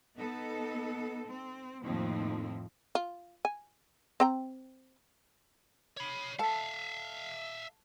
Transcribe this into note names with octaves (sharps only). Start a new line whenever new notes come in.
B3 D#4 A4
C4
F2 A2 D#3 F3 A#3 C4
F4
G#5
C4 G5 A#5
C#5 B5
A4 E5 F5 A5